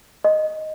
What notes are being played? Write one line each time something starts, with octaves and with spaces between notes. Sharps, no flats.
D#5